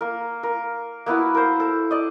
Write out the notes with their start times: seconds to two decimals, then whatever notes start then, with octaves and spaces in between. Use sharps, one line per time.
0.01 A#3 A#4
0.43 A#4
1.06 A#3 B3 E4 F#4
1.35 A#4 C5
1.60 A4
1.91 D5 D#5